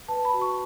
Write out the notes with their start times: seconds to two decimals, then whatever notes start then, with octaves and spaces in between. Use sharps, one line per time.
0.08 B4 A5
0.25 B5
0.34 F#4
0.41 C#6